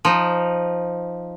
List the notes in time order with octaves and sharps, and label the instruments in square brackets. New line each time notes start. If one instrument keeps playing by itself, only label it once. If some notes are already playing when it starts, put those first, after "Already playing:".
[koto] F3 D#4